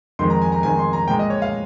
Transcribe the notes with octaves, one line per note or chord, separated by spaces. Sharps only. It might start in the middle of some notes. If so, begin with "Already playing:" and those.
F2 D#3 G#3 C6
A#5
G#5
A#5
F2 D#3 G#3 G#5
C6
A#5
A#2 G#3 G5
D#5
C#5
F5